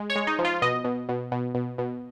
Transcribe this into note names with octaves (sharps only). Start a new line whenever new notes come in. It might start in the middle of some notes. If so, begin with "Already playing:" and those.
Already playing: G#3
C#5
G#3
D#4
F3
F4
B2 D#5
B2
B2
B2
B2
B2